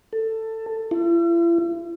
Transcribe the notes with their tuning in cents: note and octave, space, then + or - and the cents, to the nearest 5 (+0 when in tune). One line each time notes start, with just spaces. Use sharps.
A4 +15
E4 +45